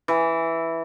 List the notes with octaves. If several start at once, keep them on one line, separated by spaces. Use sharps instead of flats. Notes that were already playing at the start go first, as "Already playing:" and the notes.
E3